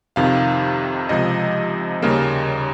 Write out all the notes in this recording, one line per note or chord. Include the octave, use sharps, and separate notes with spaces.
F2 C3 D#3 F5
C#2 C3 F3 D#5
D#2 C#3 G3 A#3